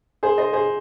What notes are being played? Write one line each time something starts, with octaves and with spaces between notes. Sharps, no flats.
G#4 C5
C5 D#5
G#4 C5